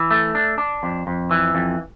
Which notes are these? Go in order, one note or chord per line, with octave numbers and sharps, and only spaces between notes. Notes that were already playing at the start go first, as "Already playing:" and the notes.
Already playing: E3
A3
D4
D4
F2
F2
E3
F2